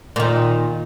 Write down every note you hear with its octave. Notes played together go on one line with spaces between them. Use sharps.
A#2 D#3